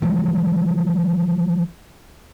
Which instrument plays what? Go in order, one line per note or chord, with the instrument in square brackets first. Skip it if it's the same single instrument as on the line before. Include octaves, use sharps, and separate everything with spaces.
[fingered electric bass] E3 F3 G3 G#3